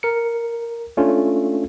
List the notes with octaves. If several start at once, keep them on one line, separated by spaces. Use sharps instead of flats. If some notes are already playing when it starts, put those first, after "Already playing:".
A#4 C#7
A3 C#4 D4 F4